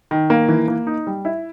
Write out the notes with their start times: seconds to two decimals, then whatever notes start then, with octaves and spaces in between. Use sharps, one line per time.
0.11 D#3
0.30 A#3
0.49 E3
0.68 A#3
0.87 D#4
1.07 G3
1.25 E4